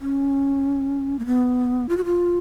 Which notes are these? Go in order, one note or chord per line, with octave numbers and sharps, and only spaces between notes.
C#4
A#3
B3
F4
F#4
F4